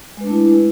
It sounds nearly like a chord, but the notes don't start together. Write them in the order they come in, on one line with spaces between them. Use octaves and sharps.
G#3 B4 D4 A3 E4